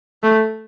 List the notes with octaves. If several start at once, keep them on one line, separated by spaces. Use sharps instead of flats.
A3